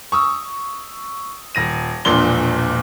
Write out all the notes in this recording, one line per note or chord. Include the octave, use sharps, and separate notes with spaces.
C#6 D#6 E6
D#1 A#6 D#7
E1 A#1 A#2 D4 C6 G7